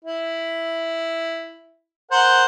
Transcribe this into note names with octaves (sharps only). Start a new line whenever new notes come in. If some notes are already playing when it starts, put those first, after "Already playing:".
E4
A#4 C5 F#5